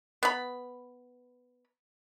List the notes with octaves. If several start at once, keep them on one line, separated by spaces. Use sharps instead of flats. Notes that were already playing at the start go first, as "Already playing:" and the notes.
B3 B5